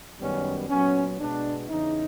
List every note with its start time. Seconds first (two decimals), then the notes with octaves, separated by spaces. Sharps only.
0.21 F#2 D#3 G3 B3 C#4
0.70 A#2 F#3 B3 C#4
1.19 B2 G#3 B3 D4
1.69 E2 C#3 E3 D#4